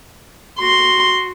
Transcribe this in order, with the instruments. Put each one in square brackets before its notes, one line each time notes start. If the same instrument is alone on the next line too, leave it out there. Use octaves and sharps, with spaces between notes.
[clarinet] F#4 [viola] C6